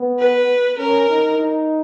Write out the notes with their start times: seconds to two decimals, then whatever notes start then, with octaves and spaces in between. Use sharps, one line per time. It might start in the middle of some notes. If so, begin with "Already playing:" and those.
Already playing: B3
0.19 B4
0.78 C#4 A#4
1.09 D#4
1.38 D#4